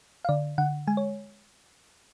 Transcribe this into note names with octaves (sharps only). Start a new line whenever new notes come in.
F5
D3 D5
D3 F#5
G#3 G#5
C#5